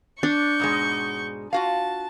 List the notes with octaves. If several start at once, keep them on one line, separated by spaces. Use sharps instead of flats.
D4 C#6 G6
G#2 B2 G#3
F4 F#4 F5 A5